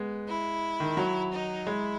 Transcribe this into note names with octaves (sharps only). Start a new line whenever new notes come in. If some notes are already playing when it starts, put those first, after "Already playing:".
Already playing: G#3 B3
E4
D#3
F#3
D#4
G#3 E4